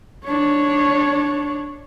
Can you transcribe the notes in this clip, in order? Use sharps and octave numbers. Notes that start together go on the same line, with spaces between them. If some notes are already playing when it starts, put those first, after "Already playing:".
D4 C#5